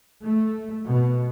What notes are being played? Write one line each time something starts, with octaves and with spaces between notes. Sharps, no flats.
A3
B2